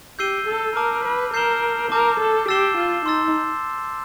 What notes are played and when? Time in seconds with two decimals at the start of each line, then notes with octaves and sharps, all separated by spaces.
0.19 G4 E6 G6 C7 D#7 G7
0.48 A4
0.76 A#4 A5 D6 F6
1.05 B4
1.34 A#4 G6 C7 E7 G7
1.91 A#4 A5 D6 G6
2.20 A4
2.48 G4 E6 A6 C7 E7 G7
2.77 F4
3.06 D#4 C6 E6 A6